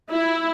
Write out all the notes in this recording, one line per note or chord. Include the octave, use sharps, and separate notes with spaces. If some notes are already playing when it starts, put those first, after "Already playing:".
E4